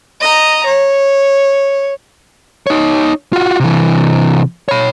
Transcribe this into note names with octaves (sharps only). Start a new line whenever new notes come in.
D#5 A#5
C#5
D#4 C#5
F4 F#4
C3 E3
C#5 B5